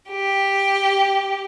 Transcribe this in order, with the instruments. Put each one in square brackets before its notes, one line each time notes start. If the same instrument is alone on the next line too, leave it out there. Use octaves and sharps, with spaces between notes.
[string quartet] G4